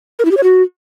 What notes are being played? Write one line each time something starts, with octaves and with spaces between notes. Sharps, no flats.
A#4
E4
G4
C#5
F#4